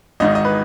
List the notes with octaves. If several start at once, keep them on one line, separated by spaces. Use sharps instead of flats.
G#1 G#2 D#3 D#5
D#5
B4